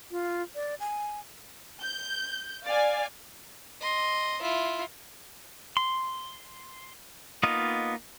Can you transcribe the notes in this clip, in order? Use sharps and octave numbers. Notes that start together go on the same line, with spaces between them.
F4
D5
G#5
G6
D5 F5 G#5
D#5 C6
E4 F4
C6
A#3 B3 D#4 F4 D#5